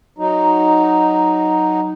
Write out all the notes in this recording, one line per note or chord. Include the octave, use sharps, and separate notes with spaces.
F#3 D#4